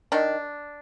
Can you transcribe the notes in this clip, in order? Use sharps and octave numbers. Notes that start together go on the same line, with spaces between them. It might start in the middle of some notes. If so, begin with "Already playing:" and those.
D#3 D4